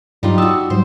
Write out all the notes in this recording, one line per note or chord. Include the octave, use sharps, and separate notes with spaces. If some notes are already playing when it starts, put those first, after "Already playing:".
G2 F#3 G3 D#4 F4
F#4 A5 D#6 E6
G#2 F#3 G3 C5